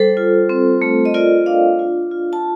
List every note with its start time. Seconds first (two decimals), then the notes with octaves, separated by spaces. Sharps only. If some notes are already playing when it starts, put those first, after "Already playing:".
Already playing: G3 A4 C5
0.17 F4
0.49 C4
0.82 A3
1.05 D#5
1.14 F4 A#4 D5
1.46 D4 D5 F5
1.79 F4
2.11 F4
2.33 A5